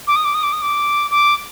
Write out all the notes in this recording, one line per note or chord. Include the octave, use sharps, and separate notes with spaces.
D6
D#6
D6
D#6
D6
D#6
D6
D6